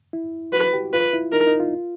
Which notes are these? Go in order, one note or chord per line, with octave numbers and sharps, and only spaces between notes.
E4
F#4 B4
G4
F4 B4
E4
D#4 A#4
D#4
F4